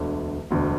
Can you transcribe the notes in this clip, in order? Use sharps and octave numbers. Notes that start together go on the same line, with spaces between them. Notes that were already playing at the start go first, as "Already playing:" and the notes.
Already playing: E1 D2 D3
E1 D2 D3